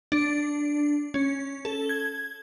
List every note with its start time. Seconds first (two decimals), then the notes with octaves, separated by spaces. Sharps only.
0.12 D4
1.14 C#4
1.65 A4
1.89 G#6